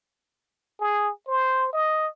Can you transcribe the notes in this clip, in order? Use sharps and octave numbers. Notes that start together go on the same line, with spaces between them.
G#4
C5
D#5